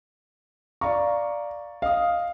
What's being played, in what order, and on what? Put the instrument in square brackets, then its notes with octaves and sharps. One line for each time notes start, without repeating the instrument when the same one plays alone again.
[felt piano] D5 F5 C#6 [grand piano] A#5
[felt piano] D#5 D#6 [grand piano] F5